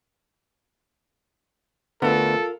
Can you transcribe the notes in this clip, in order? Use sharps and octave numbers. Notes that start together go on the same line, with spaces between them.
D2 B3 F4 A4 A#4